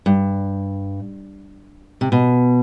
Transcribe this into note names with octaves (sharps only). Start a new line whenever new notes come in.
G2
C3
B2